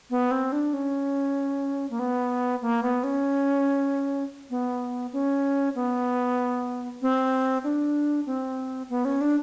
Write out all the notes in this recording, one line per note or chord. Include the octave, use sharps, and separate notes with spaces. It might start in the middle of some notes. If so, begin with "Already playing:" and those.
B3
C4
D4
C#4
A#3
B3
A#3
B3
C#4
B3
C#4
B3
C4
D4
C4
B3
C#4
D4